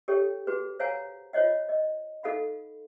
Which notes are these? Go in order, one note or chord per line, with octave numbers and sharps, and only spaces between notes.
G4 A4 C#5 G5
F#4 G#4 B4
C5 C#5 F5 F#5 G#5 A#5
F4 C5 C#5 D#5 F#5
D#5
D#4 A4 F5 F#5 B5